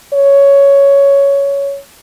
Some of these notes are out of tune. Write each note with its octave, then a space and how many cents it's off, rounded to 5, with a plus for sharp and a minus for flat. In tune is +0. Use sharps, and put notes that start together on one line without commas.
C#5 +10